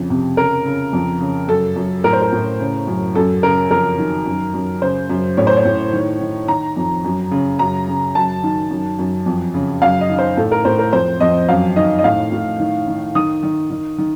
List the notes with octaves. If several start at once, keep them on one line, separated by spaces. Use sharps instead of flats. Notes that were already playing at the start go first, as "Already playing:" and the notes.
Already playing: F2 C#3
C3
C#3 A#4
C#3
F2
C#3
F#2 A4
F#2
A2 A#4
C5
A#4
A2
C#3
F#2
F#2 A4
C#3 A#4
F2 A#4
D#3
F#2
F#2
C#3 C5
F#2
A2 C#5
C5
C#5
A2
D#3
D#3
D#3 A#5
F2
F#2
C#3
F#2 A#5
C#3
F#2 A5
D#3
F#2
F#2
F2
C#3
F#2 F5
D#5
D#3
C5
A2 A4
A#4
A2 C5
A#4
F2 C5
F2 D#5
F#2 F5
D#3 D#5
D#5
A2 F5
A2
D#3
D#3
D#3 D#6
D#3
D#3
D#3